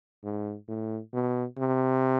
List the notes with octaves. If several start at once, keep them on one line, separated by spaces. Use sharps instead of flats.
G#2
A2
B2
C3